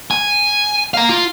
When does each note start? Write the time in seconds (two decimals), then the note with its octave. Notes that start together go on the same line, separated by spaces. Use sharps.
0.11 G#5
0.94 F5 A#5
1.09 F4